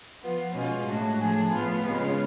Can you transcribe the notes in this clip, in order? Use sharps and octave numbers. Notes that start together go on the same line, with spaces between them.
F3 B3 F4
B2 G#3 C#4 F4
A2 G#3 D4 F#4
A2 F3 A3 D4 G#4
A2 F3 B3 F4
C#3 G#3 B3 F4